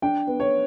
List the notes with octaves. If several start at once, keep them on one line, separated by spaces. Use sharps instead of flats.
D4 G5
B3
C#5